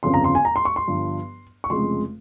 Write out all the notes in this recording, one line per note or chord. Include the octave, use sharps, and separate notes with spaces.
G1 F2 C#3 C6
A#5
C6
G#5
A#5
C6
C#6
C6
G1 G2 F3
C#6
F1 F2 C#3 G#3 C6